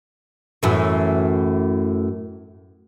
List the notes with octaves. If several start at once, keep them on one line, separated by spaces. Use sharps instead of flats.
F#2 A2 E3